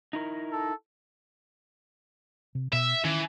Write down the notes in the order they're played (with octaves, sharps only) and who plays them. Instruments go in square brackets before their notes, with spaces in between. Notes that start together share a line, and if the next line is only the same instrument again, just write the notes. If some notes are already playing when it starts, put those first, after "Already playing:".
[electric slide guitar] D#4 E4 A#4
[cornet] A4
[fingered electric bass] C3
[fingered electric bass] B2 [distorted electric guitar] E5
[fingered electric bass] D#3 C#4 [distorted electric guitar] E3